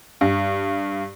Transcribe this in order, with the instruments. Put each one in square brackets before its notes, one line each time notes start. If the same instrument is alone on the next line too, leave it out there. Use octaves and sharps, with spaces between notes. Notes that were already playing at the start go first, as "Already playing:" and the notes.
[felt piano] G2